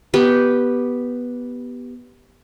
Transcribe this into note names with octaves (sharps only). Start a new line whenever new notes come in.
B3 G4 B4